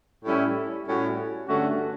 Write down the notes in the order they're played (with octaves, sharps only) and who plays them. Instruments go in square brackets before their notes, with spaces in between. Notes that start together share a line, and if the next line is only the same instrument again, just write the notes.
[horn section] A2 G3 C#4 E4
A2 G3 C#4 F#4
G2 D3 A3 C#4 F#4